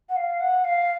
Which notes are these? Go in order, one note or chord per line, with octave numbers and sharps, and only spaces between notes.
F#5
F5
F#5
F5